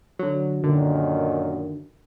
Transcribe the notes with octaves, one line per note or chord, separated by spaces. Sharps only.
D3 F#3
F#2 A#2 D3 D#3